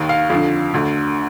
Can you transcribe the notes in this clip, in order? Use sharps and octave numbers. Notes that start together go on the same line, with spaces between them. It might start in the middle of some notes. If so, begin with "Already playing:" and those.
Already playing: D#2 D#3
F5
F2 D3
D2 D3